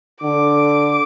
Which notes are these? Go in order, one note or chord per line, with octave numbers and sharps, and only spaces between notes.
D3 D6